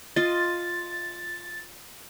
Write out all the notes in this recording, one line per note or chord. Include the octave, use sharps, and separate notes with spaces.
F4 D#5 A6